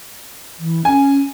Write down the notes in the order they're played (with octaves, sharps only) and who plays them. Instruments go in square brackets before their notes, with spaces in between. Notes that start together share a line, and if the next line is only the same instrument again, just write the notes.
[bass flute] E3
[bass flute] C#4 [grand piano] G#5